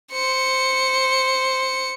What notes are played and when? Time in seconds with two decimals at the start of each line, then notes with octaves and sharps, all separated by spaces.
0.12 C5 C#7